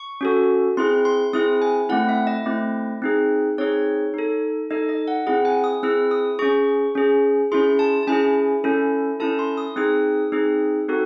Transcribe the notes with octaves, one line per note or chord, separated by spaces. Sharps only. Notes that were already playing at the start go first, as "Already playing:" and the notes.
Already playing: C#6
C#4 F#4 A4
C4 E4 G#4 C6
C6
C4 E4 G#4 D#6
G#5
A3 C4 E4 F#5
E5
D#5
A3 C4 E4
C4 D#4 G#4
C4 D#4 G#4 C#5
D#4 A4
D#4 A4 D#5
D#5
F#5
C4 E4 G#4 F#5
G#5
D#6
C4 E4 G#4 E6
D#6
C#4 G#4 C#6
C#4 G#4
C#4 E4 G#4 C6
A5
A5
C#4 E4 G#4 G#5
C#4 E4 A4
C#4 E4 A4 A5
C6
D#6
C4 D#4 G#4 D#6
C4 D#4 G#4
C4 D#4 F#4 A4